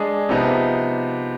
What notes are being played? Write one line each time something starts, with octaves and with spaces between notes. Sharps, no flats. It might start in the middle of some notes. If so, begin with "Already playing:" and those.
Already playing: G#3 D4 G#4
C3 F3 B3 D#4